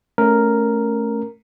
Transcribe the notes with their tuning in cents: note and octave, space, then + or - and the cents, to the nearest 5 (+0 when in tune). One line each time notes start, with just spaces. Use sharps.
A3 +0 C#4 +0 A#4 +0